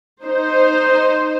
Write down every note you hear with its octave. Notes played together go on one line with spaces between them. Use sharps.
D#4 C5